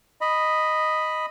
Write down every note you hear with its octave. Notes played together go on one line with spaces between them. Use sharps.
D#5 B5